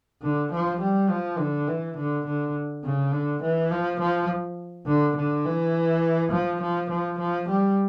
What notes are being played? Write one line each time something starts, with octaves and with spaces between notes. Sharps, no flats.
D3
F3
G3
F3
D3
E3
D3
D3
C#3
D3
E3
F3
F3
D3
D3
E3
F3
F3
F3
F3
G3